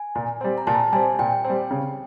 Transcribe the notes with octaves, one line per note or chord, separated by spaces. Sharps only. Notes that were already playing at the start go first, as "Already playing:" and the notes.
Already playing: G#5
A#2
G3 C4
A#5
A#2 A5
G3 C4 G#5
A#2 G5
C4
G3
C#3